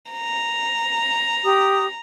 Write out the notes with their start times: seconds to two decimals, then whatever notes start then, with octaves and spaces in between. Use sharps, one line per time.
0.12 A#5
1.45 G4 D#6